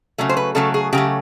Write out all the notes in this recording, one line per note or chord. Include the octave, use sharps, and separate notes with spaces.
C#3 F#3 A3
C5
B4
C#3 F#3 A3 A4
G#4
C#3 F#3 A3 G4